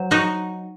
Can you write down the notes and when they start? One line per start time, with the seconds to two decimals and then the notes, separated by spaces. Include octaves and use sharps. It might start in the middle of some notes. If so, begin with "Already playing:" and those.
Already playing: F#3 C5
0.11 D#4 F#4